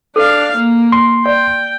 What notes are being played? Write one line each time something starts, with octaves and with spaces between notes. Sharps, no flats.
D4 A4 F5
A#3
C6
D5 G5